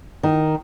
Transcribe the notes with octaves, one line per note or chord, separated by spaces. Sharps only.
D#3